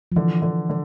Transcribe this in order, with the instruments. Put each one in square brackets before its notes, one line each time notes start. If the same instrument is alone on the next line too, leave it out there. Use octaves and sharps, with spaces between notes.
[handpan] F3
[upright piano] D3 [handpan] E3
[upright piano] D3
D3